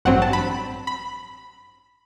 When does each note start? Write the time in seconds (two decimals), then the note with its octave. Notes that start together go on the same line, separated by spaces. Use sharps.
0.05 A1 G2 F#3 C4 F#5
0.22 A5
0.33 B5
0.87 B5